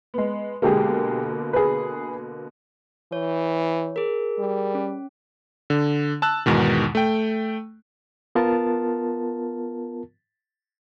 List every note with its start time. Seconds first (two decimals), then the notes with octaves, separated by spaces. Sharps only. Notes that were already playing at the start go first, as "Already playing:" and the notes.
0.14 G#3 B3
0.62 B2 D3 G#3 A#3 G4 G#4
1.53 G#4 B4
3.12 E3 C#5
3.96 G#4 A#4
4.39 G3
4.75 C#4
5.70 D3
6.22 A5 E6 F#6
6.46 E2 G#2 B2 D#3
6.95 A3 G5
8.35 B3 F4 A#4 A5